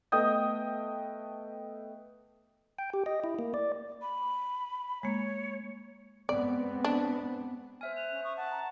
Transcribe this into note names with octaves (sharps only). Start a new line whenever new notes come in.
A3 B3 D#5 G5 D#6 G6
G5
G4
D#5
E4
A#3
D5
B5
G#3 A#3 C#5
G#3 B3 C4 D5
D4
C5 E5 G#5 F6
F#6 F7
C#4
C#6 D#6
E5 F#5 A5
A#5